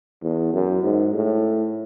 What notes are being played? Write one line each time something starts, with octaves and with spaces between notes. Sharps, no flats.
E2
F#2
G#2
A2